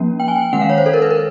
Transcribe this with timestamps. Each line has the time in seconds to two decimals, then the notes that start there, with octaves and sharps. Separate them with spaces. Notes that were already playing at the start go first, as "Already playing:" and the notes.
Already playing: F3 A#3 C#4
0.20 G5
0.28 G#5
0.36 G5
0.53 D#3 G#3 C#4 F#5
0.61 F5
0.69 C#5
0.78 C5
0.86 A4
0.94 A#4
1.02 B4
1.10 A#4